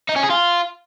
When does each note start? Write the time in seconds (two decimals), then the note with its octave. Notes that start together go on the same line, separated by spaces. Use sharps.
0.09 D#4
0.16 C#4
0.23 G#4
0.31 F4